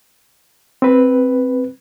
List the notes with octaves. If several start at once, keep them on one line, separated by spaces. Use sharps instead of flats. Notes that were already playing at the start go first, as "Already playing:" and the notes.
C4 B4